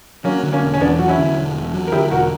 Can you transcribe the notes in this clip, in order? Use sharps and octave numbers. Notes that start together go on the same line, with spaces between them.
F#3 A#3 C#4
D3
A#3 C#4
E1
C#4
E2 B3 D4
F#3 F#4
C#4 E4
D3
E1
E2
F#3
A#4
D3 E4 G4
E1 F#4 A#4